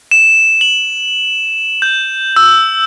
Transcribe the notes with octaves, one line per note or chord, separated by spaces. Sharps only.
E7
F#7
G6
E6